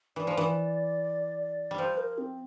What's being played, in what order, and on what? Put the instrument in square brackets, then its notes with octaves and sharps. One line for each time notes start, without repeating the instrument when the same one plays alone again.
[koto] E3 [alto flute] D5
[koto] F3
E3
G3
[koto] F3 [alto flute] C5
[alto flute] A#4
C4